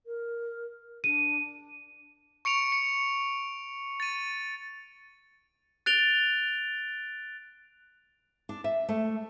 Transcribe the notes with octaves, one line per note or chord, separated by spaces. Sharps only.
A#4
D4 D#7
C#6 C#7 D7 F7
C#7
A6 D#7
F#6 A6 D7 F7 G7
D4
E5
A3